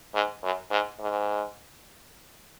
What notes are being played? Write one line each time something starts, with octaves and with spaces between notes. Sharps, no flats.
G#2
F#2
G#2
G#2